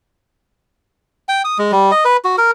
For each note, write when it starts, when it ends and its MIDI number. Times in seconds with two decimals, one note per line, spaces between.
1.29 1.42 79
1.44 1.58 87
1.58 1.72 56
1.72 1.91 55
1.91 2.04 75
2.05 2.17 71
2.24 2.36 66
2.38 2.51 70